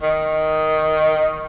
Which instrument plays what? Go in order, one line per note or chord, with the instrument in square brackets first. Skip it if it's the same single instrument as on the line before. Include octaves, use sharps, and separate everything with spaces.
[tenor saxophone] D#3